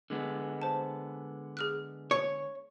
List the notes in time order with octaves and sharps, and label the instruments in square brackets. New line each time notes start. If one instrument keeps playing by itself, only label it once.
[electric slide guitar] D3 G#3 B3
[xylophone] C5 A5
G#4 F6 F#6
[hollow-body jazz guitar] C#5